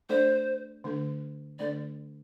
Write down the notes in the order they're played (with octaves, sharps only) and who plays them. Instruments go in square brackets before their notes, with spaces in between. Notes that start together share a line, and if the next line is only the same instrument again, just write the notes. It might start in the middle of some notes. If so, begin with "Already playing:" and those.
[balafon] A3 D4 A4 D5 [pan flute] C5
[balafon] D3 A3 D4 A4
[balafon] D3 A3 D4 A4 [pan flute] D5